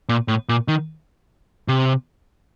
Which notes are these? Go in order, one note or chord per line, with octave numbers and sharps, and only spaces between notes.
A#2
A2
A#2
D#3
C3